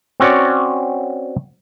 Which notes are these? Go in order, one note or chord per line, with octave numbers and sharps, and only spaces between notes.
C4 C#4 F#4 C#5 D5